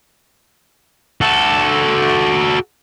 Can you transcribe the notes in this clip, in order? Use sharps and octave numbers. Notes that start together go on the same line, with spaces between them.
F#4 A4